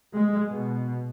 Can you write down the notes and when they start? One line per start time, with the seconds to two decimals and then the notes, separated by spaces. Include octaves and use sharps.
0.14 G#3
0.48 B2